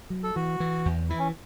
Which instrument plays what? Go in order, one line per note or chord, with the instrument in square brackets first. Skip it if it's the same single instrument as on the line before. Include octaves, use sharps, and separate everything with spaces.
[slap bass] F#3
[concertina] A4
[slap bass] E3 [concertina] F#4
[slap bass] E3
E2
[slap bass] E3 [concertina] E4
[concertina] C#4